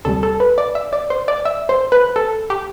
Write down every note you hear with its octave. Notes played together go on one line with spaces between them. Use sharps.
D2 C3 G3 A4
A4
B4
D5
E5
D5
C5
D5
E5
C5
B4
A4
G4